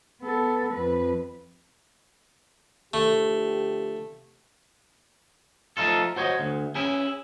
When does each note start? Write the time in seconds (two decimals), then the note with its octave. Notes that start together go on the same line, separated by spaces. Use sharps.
0.22 B3 A4
0.72 F2 B4
2.94 D3 F3 A3 G4
5.77 F3 A3 D#4 F4 A4
6.16 F#4 C5 C#5 D#5
6.40 D2
6.75 C#4 E4 G#4